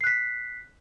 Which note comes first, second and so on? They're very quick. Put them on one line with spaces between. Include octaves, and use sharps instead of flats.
C7 F#6 B6